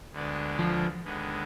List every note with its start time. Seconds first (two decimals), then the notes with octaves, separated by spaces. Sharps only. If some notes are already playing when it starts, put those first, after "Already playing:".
0.12 D2 D3 G#3 B3 D4
0.59 F3
1.04 D#2 D3 G#3 B3